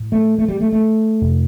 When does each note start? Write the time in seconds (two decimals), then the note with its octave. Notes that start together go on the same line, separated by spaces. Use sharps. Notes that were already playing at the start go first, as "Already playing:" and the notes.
Already playing: A2
0.12 A3
0.38 A3
0.48 G3
0.60 A3
0.72 A3
1.21 F2 C3